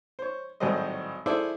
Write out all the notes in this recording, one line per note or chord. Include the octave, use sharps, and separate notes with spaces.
C5 C#5
G#1 A2 F#3 G3 C5 D#5
E4 G#4 A4 C5 D5 E5